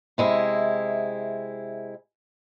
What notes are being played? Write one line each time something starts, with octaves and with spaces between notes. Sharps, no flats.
C3 G#3 E4